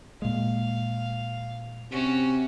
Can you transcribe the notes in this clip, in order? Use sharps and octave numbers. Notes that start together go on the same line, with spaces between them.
A#2 G#3 F5
C3 C#4 F#4